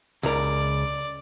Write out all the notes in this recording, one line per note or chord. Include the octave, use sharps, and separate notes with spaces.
C#2 A#4 D5